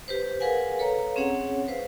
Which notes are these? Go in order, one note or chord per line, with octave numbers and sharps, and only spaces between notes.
G4 B4 C5
G#4 A#4 B4 F5 F#5 G#5
A4 B4 C#5 F5 A#5
C4 C#4 G#4 C#5 F#5
B4 C5 F5